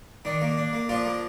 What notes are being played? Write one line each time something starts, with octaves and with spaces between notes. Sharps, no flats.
D#3 D4
A#3
D4
A#3
F3 D4 F4
A#3